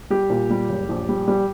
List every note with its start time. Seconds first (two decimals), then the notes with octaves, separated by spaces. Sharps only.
0.10 G3 G4
0.30 A#2
0.50 G3
0.69 F#1
0.89 A#1
1.09 G3
1.28 G3